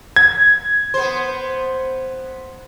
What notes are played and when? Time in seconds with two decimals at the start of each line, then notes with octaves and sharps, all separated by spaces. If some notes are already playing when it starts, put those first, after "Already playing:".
0.16 G#6
0.94 B3 C5